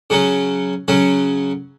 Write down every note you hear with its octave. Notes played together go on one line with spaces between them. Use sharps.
C#3 F#3 C#4
C#3 F#3 C#4